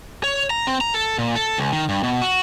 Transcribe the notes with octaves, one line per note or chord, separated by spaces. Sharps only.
C#5
A#5
C4
A#5
A4
A#2
A4
C#2
D#3
G2
B2
F#4